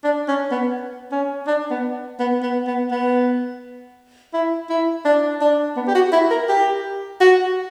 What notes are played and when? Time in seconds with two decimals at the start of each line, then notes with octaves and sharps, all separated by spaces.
0.04 D4
0.28 C#4
0.51 B3
1.12 C#4
1.47 D4
1.71 B3
2.19 B3
2.43 B3
2.67 B3
2.91 B3
4.34 E4
4.70 E4
5.05 D4
5.41 D4
5.77 B3
5.87 G4
5.95 F#4
6.12 E4
6.31 A#4
6.49 G4
7.20 F#4